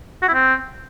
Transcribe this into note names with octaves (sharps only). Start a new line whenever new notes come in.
F#4
E4
C4